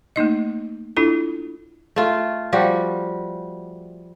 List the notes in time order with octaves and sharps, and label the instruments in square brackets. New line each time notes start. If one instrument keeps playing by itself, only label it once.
[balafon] A3 A#3 D#4 D#5
D4 E4 F4 A4
[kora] A3 F4
F3 G3 F#4